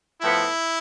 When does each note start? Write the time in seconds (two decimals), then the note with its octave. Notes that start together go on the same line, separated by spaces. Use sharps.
0.20 A2 F3 B3 E4